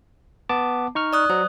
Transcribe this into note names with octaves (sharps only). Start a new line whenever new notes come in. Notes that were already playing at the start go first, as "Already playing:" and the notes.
B3 A5 D6
D#4 C#6 F6
D5 D#6 F#6
F#3 C5